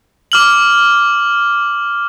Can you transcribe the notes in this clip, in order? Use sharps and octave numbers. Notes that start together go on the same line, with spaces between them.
D6 F6 F#7